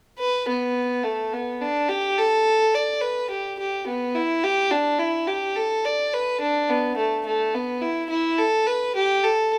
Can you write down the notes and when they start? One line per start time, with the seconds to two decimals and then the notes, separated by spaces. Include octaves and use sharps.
0.19 B4
0.49 B3
1.04 A3
1.33 B3
1.61 D4
1.89 G4
2.18 A4
2.75 D5
3.02 B4
3.30 G4
3.59 G4
3.87 B3
4.15 E4
4.44 G4
4.72 D4
4.99 E4
5.28 G4
5.56 A4
5.85 D5
6.13 B4
6.41 D4
6.70 B3
6.97 A3
7.26 A3
7.55 B3
7.82 E4
8.10 E4
8.38 A4
8.67 B4
8.96 G4
9.24 A4